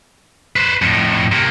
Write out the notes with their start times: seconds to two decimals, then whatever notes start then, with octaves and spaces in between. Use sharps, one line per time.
0.56 B4 C5
0.82 F2 A2
1.32 C3 A#3